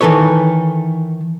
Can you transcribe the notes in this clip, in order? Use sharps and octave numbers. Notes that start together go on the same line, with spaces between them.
D#3 E3 A4 B4 C#5